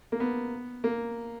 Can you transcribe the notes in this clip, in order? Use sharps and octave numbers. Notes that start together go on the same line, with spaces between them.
A#3
B3
A#3